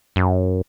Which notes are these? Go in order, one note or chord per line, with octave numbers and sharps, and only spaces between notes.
F#2